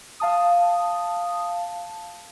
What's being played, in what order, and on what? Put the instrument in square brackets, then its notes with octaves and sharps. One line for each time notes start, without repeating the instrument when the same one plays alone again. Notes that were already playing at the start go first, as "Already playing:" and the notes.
[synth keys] F5 A5 D#6